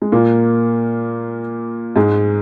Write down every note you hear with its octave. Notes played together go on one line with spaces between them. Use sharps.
G#3
A#2 A#3
G#2 G#3